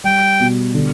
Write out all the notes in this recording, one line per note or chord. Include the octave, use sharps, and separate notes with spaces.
G3 G5
B2
D3